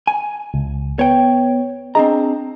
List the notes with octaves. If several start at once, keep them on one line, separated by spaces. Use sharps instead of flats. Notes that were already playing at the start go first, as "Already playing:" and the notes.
G#5
C#2
B3 C#5 G5
C4 D4 G#4 D#5 A#5